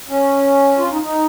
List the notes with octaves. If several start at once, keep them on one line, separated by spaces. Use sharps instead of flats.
C#4
F4
D#4
D#4